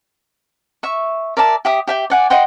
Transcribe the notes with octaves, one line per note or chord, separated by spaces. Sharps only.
E5 C#6
A#4 D5 E5 A5
G4 E5 D#6
G4 E5 G5
D5 F#5 G#5
D#5 F#5 G5 C6